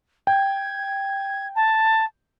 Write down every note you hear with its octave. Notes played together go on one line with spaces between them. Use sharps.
G5 G#6
A5